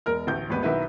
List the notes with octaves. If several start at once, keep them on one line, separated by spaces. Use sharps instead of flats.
E1 A#4 F6
A1 D2 G6
D#1 G#1 B3 B4
B1 D#3 E4 B4